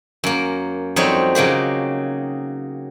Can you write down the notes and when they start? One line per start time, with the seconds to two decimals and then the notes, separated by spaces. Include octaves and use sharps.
0.24 F#2 A#3
0.96 F2 F#3 G3 C4 D#4 C#5
1.35 C#3 F#3 A#3 G4